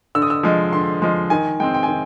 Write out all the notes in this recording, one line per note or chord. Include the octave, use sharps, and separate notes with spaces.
D3 E6
D#6
E6
F3 G#3
D3 C6
F3 G#3
D#3 G#5
G#3 C4 G5
G5
G#5
D#3